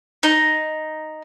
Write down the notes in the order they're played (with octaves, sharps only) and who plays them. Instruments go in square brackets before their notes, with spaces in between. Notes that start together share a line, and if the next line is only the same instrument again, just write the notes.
[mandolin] D#4